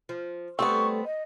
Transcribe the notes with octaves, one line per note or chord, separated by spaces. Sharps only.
F3
G3 A3 B3 C4 C#6
D#5